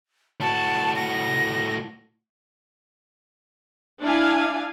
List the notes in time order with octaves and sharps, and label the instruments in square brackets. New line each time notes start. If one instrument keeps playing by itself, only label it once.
[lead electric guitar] A2 F#4 [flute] A5
[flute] A#6
[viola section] D4 E4 F5 G#5